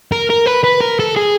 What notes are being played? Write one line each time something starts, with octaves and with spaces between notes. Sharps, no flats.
A#4
A#4
B4
B4
A#4
A4
G#4